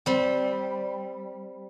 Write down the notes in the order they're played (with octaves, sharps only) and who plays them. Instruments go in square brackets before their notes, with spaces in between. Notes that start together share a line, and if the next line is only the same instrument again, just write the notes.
[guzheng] G3 C4